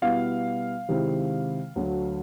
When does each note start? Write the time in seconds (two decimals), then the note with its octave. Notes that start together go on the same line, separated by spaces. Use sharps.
0.02 B2 G3 B3 E4 F5
0.88 C3 D#3 G#3 C4 E4
1.76 D2 D3 F#3 A3